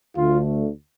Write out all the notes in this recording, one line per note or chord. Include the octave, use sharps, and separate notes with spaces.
D2 D3 A3 F4